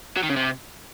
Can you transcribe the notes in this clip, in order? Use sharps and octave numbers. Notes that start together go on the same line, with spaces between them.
F#3
D#3
C#3
C3